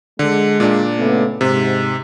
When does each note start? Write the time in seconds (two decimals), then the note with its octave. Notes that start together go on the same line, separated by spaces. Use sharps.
0.19 D3 G#3
0.60 A#2 D4
0.98 C#3 A3 B3
1.41 G#2 C3